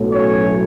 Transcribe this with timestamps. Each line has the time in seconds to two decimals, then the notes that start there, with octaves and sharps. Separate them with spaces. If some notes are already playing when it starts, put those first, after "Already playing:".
Already playing: B1 A2 F#3 A3
0.11 C#4 C#5